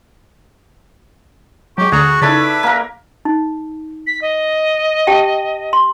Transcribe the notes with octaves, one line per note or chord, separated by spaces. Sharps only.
F#3 G#3 G4 C#6
D2 D3 F#4 G#4 A#5
C#3 D#4 E4 A4 B4 D5
A#3 A#4
D#4
B6
D#5
G4 G5 A5
C6